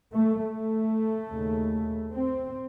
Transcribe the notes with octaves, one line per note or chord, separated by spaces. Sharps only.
A3
A3
D#2 C#3
C4